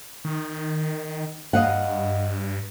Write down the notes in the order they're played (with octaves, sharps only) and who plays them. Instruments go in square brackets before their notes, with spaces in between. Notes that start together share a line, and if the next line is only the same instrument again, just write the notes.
[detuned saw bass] D#3
[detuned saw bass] G2 [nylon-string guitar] D#5 F5 F#5